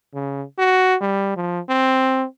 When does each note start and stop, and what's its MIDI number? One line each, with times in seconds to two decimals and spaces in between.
0.15 0.43 49
0.59 0.96 66
1.01 1.34 55
1.37 1.60 53
1.69 2.26 60